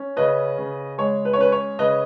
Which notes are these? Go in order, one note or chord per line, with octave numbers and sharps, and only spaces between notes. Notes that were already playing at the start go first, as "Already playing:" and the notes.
Already playing: C#4
C#3 B4 D#5
C#3
G#3 C#5
B4
C#5
C#4 B4
C#5
C#3 B4 D#5